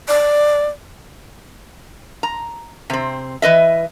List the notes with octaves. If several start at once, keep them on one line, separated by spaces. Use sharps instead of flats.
D5
A#5
C3 C4
E3 B4 D#5 E5